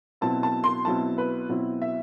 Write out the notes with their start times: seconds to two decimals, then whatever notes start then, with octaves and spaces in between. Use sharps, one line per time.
0.21 B2 F#3 C4 E4 A5
0.43 A5
0.64 C6
0.85 B2 F#3 C4 E4 A5
1.18 B4
1.49 B2 F#3 C4 E4
1.82 E5